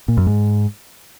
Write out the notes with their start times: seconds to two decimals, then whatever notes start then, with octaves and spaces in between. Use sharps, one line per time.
0.08 A#2
0.17 F#2
0.27 G#2